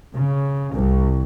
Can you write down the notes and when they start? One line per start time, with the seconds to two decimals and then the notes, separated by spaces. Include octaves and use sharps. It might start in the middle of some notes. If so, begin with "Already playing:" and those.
0.12 C#3
0.71 C2